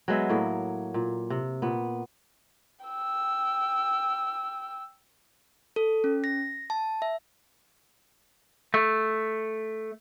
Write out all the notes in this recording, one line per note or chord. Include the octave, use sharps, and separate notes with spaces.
F#3 G#3 B3 E5
A2 A#3
A#2
C3
A#2 B3
G5 E6
A4
C#4
A#6
A5
E5
A3